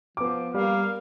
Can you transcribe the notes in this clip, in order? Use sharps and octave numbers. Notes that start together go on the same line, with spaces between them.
F3 B3 D6
G3 A#3 F5